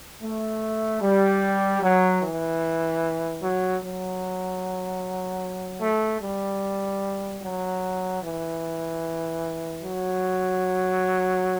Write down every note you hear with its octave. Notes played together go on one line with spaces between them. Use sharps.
A3
G3
F#3
E3
F#3
F#3
A3
G3
F#3
E3
F#3